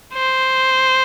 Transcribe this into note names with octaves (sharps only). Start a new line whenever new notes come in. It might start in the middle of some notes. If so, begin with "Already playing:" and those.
C5